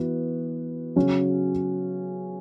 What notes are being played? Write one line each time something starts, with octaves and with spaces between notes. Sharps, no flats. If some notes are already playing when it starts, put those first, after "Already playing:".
Already playing: E3 B3 F#4
C#3 F#3 C#4 F#4 C#5